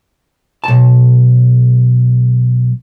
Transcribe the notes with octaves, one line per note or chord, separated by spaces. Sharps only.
B1 A5